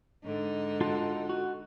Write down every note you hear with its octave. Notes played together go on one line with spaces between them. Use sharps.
G#2 D3 D#4
F4 F#4 A4
F#4